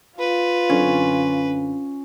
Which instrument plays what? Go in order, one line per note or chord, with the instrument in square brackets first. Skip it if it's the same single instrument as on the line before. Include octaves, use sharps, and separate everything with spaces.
[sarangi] F4 [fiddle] B4
[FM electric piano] F#2 D3 C4 [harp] C#4